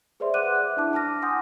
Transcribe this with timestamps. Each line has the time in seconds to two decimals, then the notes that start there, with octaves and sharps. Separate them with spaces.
0.20 G#4 B4 C5 D5 E5 C6
0.34 E5 F#5 D6 F#6 D#7
0.51 E5 F#6
0.77 D4 E4 A5 D6
0.93 A5 D6 F6 A#6
1.22 F#5 G#5 C6 D#6 G6